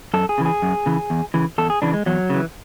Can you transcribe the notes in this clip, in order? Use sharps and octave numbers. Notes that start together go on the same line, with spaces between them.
F#2 A4
G#4
C#3 E3
G#4
F#2
C#3 E3
E2
C#3 E3
E2 A4
G#4
C#3 E3 D4
G#3
E2 F#3
C#3 E3